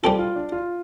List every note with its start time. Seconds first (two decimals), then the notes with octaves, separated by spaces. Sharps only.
0.03 G3 C4 F4 A4
0.19 F4
0.36 D4
0.52 F4